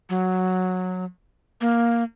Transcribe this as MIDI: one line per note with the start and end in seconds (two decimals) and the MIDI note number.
0.09 1.05 54
1.61 2.03 58